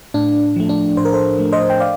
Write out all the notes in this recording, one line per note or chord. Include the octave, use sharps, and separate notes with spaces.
A2 D4
F3 A3
D4
A2 C5
A#4
A4 C5
F3 A3
C5 D#5
G5
D5 F5